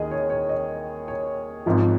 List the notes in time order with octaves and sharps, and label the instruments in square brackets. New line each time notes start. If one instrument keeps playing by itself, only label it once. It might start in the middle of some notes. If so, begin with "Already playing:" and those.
Already playing: [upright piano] D#2 D#3 G#4 D#5
C#5
C#5
D#5
C#5
G#1 G#2 F3